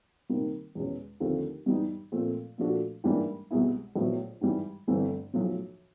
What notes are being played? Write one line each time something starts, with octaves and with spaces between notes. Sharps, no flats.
C3 D#3 G3 A#3
E2 B2 G#3 C#4
D#2 D3 F3 A3 C4
G2 E3 G3 B3 D#4
A#2 F3 A3 C4 F4
A#2 F3 A3 D4 F#4
G#2 E3 G3 A#3 D4
C2 B2 G#3 B3 E4
A#1 A2 F#3 B3 E4
G#2 E3 G3
G1 G2 E3 A3 C4
B1 A2 F3